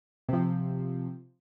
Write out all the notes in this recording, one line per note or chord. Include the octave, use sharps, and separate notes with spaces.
C3 F3